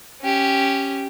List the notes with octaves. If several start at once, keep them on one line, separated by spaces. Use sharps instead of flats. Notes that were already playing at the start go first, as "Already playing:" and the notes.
C#4 G4